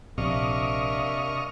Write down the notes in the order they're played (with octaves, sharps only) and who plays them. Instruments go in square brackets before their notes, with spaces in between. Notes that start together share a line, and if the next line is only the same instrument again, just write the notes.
[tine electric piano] A#1 [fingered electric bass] C3 [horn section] A#3 D4 E5 [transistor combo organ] D#5 C#6 F6